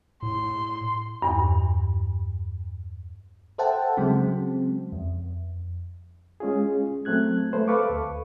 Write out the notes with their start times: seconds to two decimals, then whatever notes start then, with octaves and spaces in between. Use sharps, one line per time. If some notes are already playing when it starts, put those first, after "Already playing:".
0.23 A2 C6
1.22 E2 G2
3.58 A4 C5 E5 F#5 G5 A5
3.97 C#3 F#3 G#3 C4
4.92 F2
6.40 G#3 C#4 F4 G#4
7.05 F#3 A3 C4 F#6 G#6
7.53 A3 B4 C5
7.68 A4 B4 F5 C#6 D6
7.90 D2